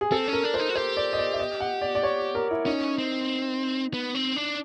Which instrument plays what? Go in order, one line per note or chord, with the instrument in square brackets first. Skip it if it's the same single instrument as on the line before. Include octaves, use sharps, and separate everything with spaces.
[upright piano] G#4
[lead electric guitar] C4 [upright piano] A4
[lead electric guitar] C#4
[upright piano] A#4
[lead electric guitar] D4
[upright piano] C5
[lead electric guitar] D#4
F#4
[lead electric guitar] G4 [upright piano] C5
[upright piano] D5
D#5
D5
E5
D#5
F#5
D5
D5
C#5
A#4
E4
[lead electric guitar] C#4 [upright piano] D#4
[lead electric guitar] C4
B3
C4
D4